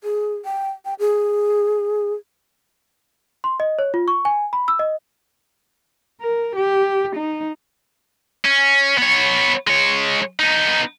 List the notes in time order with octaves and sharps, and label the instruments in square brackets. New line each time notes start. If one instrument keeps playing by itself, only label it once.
[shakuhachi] G#4
G5
G5
G#4
[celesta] C6
D#5
C#5
F4
C#6
G#5
B5
E6
D#5
[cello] A#4
G4
D#4
[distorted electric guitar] C#4
B3 C#5
G#3 C#5
B3 D#4